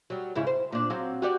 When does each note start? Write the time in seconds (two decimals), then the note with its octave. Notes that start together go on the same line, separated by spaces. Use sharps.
0.10 F#3 G3
0.36 G#2 C#3 E4
0.47 C5
0.72 A#2 D4
0.90 F#3 C4 F5
1.22 F#4 G4 D5